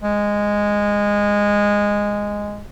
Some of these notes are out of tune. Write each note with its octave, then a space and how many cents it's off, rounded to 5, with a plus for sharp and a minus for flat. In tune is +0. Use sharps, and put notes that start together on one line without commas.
G#3 -10